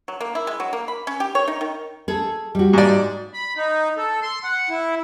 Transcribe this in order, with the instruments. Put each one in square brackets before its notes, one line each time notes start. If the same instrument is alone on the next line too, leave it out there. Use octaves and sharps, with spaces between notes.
[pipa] F#3
A#3
E4
G#3
F#3
A#3
B5
C#4
G4
C#5
D#4
D#3
[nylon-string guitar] G#4 A4
G3 F#4
[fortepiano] G#2 D5
[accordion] B5
D#4
A4
C6
F#5
E4